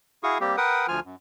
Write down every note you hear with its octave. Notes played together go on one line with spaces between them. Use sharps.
E4 F#4 G#4 F5 C#6 D#6
G3 A#3 C4 G4
A#4 B4 F#5 G5 D#6
D2 F3 F4 G#5 F6
F#2